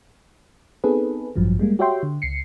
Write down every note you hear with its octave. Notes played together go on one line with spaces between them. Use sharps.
B3 C4 D#4 G#4 A4 B4
A1 G2 F3 F#3
G3 G#3 A#3
F#4 G4 C#5 E5 G5 C6
D3
C#2 C7 C#7